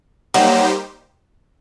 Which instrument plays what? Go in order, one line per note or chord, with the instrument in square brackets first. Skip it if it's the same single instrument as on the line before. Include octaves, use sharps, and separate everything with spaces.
[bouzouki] F#3 [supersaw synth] G3 A#3 D#4 G4 C5